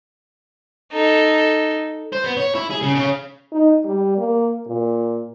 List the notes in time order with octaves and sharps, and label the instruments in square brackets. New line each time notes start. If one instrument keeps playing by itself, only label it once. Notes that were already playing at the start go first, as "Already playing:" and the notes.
[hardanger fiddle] D#4 A4
[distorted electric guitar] C5
B3
C#5
E4
G#4
C#3
C#3
[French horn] D#4
G3
A#3
A#2